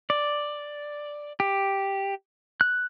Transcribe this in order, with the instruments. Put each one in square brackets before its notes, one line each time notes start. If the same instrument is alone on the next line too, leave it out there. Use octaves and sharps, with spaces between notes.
[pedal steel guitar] D5
G4
F#6